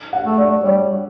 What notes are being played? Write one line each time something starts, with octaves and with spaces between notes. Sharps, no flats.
F#5
A3
D5
G3 C#5